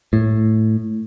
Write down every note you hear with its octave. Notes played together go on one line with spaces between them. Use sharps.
A2